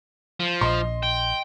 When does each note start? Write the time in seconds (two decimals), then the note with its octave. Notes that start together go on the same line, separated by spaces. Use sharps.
0.40 F3
0.61 A#1 D#5 C6
1.03 G5